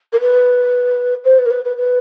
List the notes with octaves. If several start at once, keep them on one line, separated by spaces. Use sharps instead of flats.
A#4
B4
C5
B4
A#4
B4
B4
B4